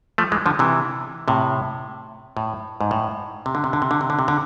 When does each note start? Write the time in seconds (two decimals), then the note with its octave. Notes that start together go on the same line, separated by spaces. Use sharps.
0.18 F3 A3
0.32 E3 G#3
0.46 D3 F3
0.59 C3 E3
1.28 A2 C3
2.37 A2
2.81 G#2
2.91 A2
3.46 C3
3.55 D3
3.64 C3
3.73 D3
3.82 C3
3.91 D3
4.01 C3
4.10 D3
4.19 C3
4.28 D3